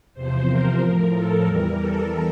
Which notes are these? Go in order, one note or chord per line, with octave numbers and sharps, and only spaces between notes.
E2 C3 F3 C5
A#4
A2 F3
A4
E2 E3 G3 A#4
A4